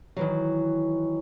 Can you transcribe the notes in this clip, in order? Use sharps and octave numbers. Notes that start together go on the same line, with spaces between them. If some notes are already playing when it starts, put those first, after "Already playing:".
D#3 E3 F#3